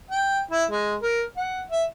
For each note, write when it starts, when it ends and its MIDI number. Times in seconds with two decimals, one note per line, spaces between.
0.11 0.40 79
0.51 0.64 64
0.71 0.95 56
1.02 1.23 70
1.37 1.63 78
1.70 1.84 76